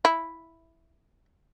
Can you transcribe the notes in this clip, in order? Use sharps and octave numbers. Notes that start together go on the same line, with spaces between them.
E4